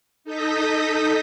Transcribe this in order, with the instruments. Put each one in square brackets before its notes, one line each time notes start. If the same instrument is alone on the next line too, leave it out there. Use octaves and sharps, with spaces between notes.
[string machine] D#4 A4 D#6 G6 A#6 B6